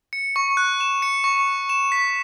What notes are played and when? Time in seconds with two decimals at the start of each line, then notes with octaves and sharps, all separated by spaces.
0.13 C#7
0.36 C#6
0.57 F#6
0.81 E7
1.02 C#7
1.24 C#6
1.47 F#6
1.69 E7
1.92 B6